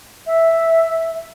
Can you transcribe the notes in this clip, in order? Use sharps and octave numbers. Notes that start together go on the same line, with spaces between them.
E5